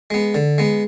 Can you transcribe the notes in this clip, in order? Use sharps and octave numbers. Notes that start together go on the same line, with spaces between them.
G#3 B3
D3
G#3 B3